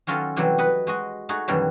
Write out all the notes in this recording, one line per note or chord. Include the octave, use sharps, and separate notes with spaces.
D#3 F#3 C#4 F4 A4 D#5
C3 E3 F#3 G3 C4
B4 D#5 F#5
G#3 F#4 D#5
A3 D#4 F#4 G#4
F#2 B2 D#3 E3 F#3 G3